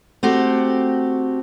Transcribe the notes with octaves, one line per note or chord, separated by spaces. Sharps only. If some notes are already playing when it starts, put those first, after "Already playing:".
A3 C4 F#4 G4